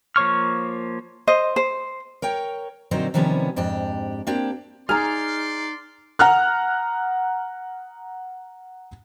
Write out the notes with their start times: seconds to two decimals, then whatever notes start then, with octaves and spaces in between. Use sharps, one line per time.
0.16 F3 A#3 C#5 C#6 F6
1.27 C5 D#5
1.56 C5
2.22 A#4 C#5 G5
2.91 A#2 D3 F#3 C4 D#4 C5
3.14 C3 D#3 F3 G3 B3 C#4
3.56 F2 G#2 D4 G4
4.27 A#3 C4 D4 G4
4.89 D#4 G#4 D5 A#5 C6 F6
6.19 F#5 A#5 F6 F#6